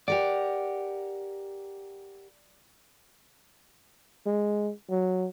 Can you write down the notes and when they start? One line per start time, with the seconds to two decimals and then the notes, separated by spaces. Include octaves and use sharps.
0.08 G4 A#4 D5 F#5
4.26 G#3
4.90 F#3